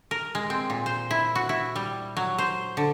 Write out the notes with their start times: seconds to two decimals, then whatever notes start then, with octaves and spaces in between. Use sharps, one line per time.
0.11 A#4
0.35 G#3
0.50 C4
0.70 A#2
0.86 C5
1.11 E4
1.35 F#4
1.49 E4
1.76 G3
2.17 F#3
2.38 C5
2.77 D3